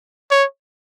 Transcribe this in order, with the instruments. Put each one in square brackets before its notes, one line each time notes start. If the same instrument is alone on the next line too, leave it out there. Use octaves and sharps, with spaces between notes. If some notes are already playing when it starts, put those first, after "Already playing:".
[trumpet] C#5